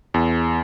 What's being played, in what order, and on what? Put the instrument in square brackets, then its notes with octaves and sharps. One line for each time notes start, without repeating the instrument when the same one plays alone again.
[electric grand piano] E2